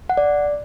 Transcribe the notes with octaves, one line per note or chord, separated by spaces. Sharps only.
F#5
D5